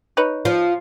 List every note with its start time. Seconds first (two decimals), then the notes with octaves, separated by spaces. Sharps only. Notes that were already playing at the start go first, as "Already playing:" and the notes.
0.17 D#4 B4 C#5
0.45 F3